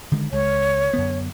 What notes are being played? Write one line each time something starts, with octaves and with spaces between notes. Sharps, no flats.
D3 D#3 G#3
C#2 G#3 C#5
F#2 D3 B3